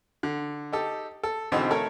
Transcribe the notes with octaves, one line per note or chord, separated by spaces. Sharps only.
D3
D#4 G4 A4
A4
G#2 B2 D3 E3 C4 D#4
A3 A4 A#4 C#5